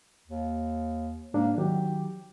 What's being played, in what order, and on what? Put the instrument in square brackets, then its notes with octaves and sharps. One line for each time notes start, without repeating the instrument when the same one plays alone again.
[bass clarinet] D#2
[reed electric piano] G#2 D4 [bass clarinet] A#3
[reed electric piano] D#3 F#3 [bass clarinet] G4